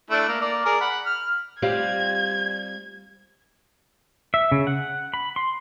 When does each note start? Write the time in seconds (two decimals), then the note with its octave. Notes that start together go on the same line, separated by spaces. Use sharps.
0.10 A3 D4 E4
0.29 A#3
0.41 A#3 D5
0.65 G#4 A#4 D5
0.81 F#5 B5
1.06 F6
1.62 G3 C4 F4 G#6
4.34 E5
4.52 C#3
4.67 F#5
5.14 B5
5.36 C6